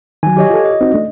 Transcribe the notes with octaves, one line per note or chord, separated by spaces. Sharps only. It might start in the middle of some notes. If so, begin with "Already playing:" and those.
D#3 F#3 G#5
G4 C#5 D#5
F4 A4
D#5
C4 D#4 F#4
A3 D4